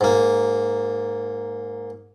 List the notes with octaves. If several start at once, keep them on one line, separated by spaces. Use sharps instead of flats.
G#2 A#3